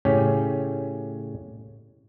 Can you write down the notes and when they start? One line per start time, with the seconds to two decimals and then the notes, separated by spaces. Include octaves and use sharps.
0.05 A2 C#3 C#4 G4